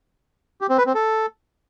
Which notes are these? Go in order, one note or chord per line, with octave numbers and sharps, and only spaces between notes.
G4
C4
B4
C4
A4